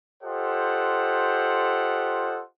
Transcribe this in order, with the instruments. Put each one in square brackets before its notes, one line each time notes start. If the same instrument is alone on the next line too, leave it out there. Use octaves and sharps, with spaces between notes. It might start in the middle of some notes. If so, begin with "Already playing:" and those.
[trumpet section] F4 G4 A4 C5 D#5 F#5